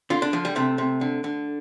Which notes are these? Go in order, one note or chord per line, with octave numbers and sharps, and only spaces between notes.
D3 F4
D4
D3 F3
G3
C3 A3
C3
D3
D3